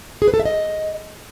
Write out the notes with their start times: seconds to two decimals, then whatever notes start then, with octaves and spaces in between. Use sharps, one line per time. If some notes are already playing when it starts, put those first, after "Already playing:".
0.22 G#4
0.28 B4
0.34 A4
0.40 E5
0.45 D#5